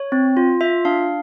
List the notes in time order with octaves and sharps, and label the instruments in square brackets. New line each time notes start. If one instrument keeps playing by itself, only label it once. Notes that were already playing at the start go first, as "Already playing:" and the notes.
Already playing: [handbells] C#5
C4
F4
F4 E5
D4 F5